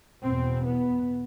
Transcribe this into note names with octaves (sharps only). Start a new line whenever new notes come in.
E2 B2 C4
B3